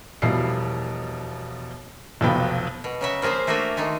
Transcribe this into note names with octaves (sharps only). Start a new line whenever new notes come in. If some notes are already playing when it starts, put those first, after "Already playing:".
E1 B2 F3 G3 E4 C7
F1 B1 F3 B3 G5 B5
B2
C#3 F#3 E5
F3 A#3 G#4 C5 E5
A3 A#3 D4 F#4 E5 G#5
D#3 G#3 A3 G#5